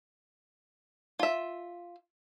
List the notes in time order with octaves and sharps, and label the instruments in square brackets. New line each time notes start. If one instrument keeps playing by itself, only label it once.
[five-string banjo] F4 E5